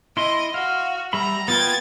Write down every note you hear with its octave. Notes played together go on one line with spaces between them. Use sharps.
E4 D#5 C6
F#4 F5
G3 E5 A#5 B5
B3 F4 G5 G#6 A6